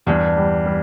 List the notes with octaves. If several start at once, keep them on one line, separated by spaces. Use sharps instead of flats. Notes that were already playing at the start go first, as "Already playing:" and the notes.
E2 G2
G3
G3